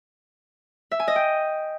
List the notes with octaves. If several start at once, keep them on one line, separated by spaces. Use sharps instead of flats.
E5
G#5
D#5
G5